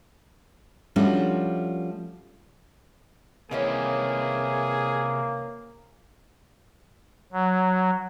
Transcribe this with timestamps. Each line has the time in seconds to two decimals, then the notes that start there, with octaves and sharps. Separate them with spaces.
0.96 F3 G3 A3 C#4 D4 F#4
3.51 C3 D#3 E3 A#3 C#4 E4 G#4
7.33 F#3